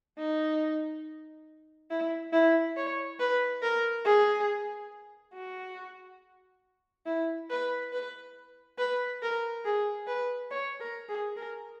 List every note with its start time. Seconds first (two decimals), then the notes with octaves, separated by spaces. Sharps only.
0.18 D#4
1.91 E4
2.33 E4
2.77 C#5
3.20 B4
3.62 A#4
4.05 G#4
5.34 F#4
7.06 E4
7.50 B4
7.93 B4
8.78 B4
9.22 A#4
9.65 G#4
10.07 B4
10.51 C#5
10.80 A#4
11.09 G#4
11.36 A#4